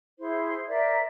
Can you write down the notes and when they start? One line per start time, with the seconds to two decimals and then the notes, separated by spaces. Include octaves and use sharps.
0.20 E4 G#4 C5
0.67 A#4 C5 D5 E5